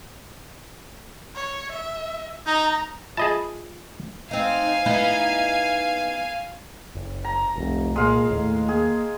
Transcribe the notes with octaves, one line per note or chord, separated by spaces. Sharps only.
C#5
E5
D#4 A#5
F4 G#4 D#5 E5 A5 B5
C4 D#4 F5 G#5
B3 D#4 E4
F#1
A#5
F1 C2
A#2 G#3 F5
D#2 A2
A#3 G#4